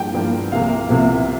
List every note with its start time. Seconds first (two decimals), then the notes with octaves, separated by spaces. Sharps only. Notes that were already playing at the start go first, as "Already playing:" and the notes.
Already playing: G2 F3 A#3 G5
0.13 G2 F3 A#3
0.52 C2 C3 F3 A#3 F5
0.89 C2 C3 F3 A#3